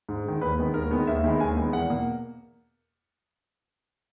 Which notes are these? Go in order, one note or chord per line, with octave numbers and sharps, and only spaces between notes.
G#2
D#3 G#3
D#2 B4
D#3 G#3 B3
D#2 A#4
D#3 G#3 B3
D#2 E5
D#3 G#3 B3 E5
D#2 G#5
D#3 G#3 B3
E2 F#5
B2 A#3